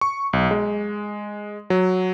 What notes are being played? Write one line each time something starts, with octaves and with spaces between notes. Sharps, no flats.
C#6
B1
G#3
F#3